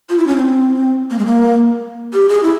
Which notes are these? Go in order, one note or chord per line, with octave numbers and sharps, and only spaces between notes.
F4
E4
C#4
C4
A#3
G#3
A#3
G4
G#4
E4